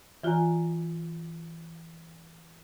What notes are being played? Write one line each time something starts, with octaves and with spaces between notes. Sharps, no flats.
E3 F4 F#4 D5 G#5 A#5